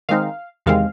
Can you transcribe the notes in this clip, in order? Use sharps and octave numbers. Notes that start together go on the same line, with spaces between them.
D#3 G#3 C4 D#4 F5
E2 C3 D#3 G#3 C4 F5